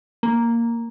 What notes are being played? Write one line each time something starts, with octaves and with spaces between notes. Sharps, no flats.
A#3